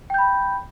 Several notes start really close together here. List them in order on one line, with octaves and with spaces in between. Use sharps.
G5 G6 B5